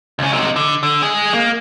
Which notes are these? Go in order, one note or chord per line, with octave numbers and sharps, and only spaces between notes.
C#2 C#4
C3 D#4
D3
D3
G#3 G#4
A#3